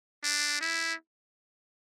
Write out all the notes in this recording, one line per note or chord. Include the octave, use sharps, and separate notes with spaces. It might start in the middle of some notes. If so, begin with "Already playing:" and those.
D4
E4